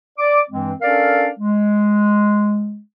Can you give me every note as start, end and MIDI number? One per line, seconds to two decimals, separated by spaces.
0.18 0.40 74
0.18 0.40 86
0.50 0.72 43
0.50 0.72 52
0.50 0.72 56
0.50 0.72 60
0.81 1.28 61
0.81 1.28 62
0.81 1.28 69
0.81 1.28 70
0.81 1.28 74
0.81 1.28 77
1.39 2.79 56